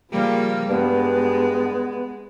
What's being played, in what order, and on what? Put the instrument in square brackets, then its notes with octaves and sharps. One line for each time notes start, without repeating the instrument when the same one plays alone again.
[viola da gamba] C#3 G3 A#3 [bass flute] F3
[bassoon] G2 [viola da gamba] G#3 [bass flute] B3